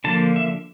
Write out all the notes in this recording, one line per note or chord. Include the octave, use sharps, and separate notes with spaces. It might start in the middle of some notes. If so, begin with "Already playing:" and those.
D3 F3 A#3 A5
E5